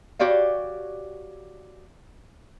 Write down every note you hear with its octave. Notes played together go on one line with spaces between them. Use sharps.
F#4 G4 C#5 D5 F5